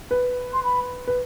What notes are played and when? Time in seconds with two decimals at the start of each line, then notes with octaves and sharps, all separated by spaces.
0.11 B4
0.53 C6
0.64 B5
1.07 B4